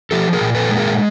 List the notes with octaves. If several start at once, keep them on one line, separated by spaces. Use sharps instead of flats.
F3 G4 A4
G#4 A#4
A#2
A4 B4
G#3
G#4 A#4